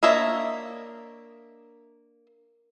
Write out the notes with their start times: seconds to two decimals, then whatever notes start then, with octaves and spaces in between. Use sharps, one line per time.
0.03 A#3 D4 C#5 D#5 E5